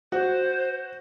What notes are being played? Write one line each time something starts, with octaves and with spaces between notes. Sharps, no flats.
F#4 C5